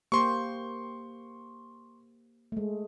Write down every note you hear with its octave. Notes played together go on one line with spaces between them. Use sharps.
A#3 G4 C5 C6 C#6
G#3 A3